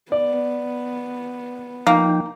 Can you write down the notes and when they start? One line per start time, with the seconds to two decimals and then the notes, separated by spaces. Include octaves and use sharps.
0.12 B3 D5
1.87 F3 A#3 D#4 G5